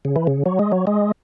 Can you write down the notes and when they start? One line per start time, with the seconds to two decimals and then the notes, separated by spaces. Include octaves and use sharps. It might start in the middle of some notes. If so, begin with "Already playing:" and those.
0.05 C#3
0.16 E3
0.27 C#3
0.46 F#3
0.59 G#3
0.72 F#3
0.87 G#3